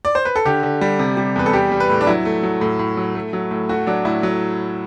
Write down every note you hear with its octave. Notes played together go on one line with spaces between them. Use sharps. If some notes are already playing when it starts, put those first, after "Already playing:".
D5
C5
B4
A4
D3 G4
D3
G3
C3
G3
E2 B4
A4
G3 G4
G3
B4
A2
D4
F#3 E4
A3
F#3
A2
A2
F#3
A3
F#3
A2
A3 F#4
F#3 D4
A2 E4
F#3